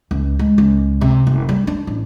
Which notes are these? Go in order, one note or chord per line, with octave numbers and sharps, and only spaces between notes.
C#2
G#3
C#2
C3
F#1
G3
D4
A1